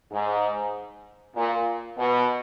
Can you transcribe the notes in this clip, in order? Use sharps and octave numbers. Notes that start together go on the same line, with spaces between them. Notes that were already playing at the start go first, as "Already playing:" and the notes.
G#2
A#2
B2